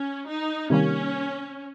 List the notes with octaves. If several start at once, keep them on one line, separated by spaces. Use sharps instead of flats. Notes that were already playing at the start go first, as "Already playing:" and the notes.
Already playing: C#4
D#4
C3 D#3 G3 A#3 C#4